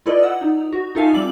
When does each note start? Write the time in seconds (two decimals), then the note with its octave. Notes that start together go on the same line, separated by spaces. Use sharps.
0.06 E4 F4 A4 B4 D5 D#5
0.23 F#5 E6
0.41 D#4
0.73 F#4
0.95 D#4 F4 A4 E5 F5 G#5
1.13 F3 G3 C4 D6 F#7